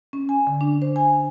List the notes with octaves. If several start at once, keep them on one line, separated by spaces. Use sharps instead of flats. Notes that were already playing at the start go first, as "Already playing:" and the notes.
C#4
G#5
D3
D4
C5
G#5